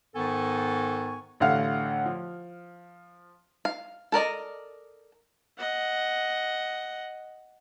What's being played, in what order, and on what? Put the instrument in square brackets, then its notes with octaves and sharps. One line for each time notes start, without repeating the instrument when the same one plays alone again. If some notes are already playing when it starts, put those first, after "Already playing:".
[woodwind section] G#2 D#3 B3 A4 G#5 C#6
[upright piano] A1 D3 A3 F5 F#5 F6
F3
[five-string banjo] F5
A4 A#4 D5 D#5
[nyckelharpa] D#5 F#5